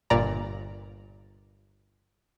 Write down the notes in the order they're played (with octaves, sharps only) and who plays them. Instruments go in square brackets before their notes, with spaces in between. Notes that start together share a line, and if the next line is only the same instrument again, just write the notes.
[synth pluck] G1 A#2 D5 A#5